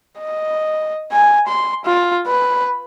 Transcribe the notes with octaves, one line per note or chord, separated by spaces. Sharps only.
D#5
G#5
C6
F4
B4